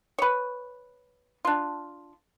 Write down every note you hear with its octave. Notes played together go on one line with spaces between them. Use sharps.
B4 C#5
D4 F4